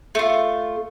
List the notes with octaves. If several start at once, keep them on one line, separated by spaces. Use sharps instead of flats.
A3 F4